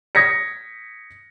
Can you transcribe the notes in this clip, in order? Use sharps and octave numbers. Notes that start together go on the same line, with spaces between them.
D#6 G#6 A#6 B6 C#7